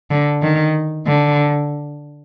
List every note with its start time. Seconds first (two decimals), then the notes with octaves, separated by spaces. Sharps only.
0.11 D3
0.42 D#3
1.07 D3